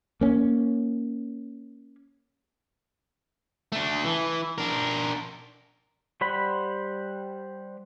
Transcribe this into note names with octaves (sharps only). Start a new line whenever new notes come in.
A#3 C#4
A3 D4
E3
D4 A#4
G3 C5 F#5 B5